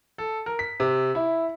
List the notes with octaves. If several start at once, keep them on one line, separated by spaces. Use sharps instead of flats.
A4
A#4
B6
C3
E4